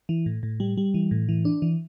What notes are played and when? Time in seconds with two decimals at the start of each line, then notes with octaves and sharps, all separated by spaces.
0.09 E3
0.26 A2
0.43 A2
0.60 G3
0.77 G3
0.94 E3
1.11 A2
1.29 E3
1.45 D4
1.62 E3